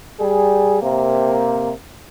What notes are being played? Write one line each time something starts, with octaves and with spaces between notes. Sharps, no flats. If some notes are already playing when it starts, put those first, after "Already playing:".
G3 G#4
C3 A#3